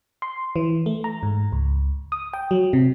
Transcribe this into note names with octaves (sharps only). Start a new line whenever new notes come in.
C6
E3
A3
A#5
G#2
C#2
D#6
G5
F#3
C3